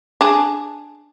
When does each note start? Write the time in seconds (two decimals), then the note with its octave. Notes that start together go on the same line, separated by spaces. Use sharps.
0.21 D4 G#4